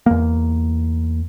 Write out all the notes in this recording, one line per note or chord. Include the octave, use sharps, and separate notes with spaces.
E2 A#3